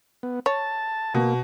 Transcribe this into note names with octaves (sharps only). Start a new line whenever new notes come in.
B3
C#5 A5
B2 A#3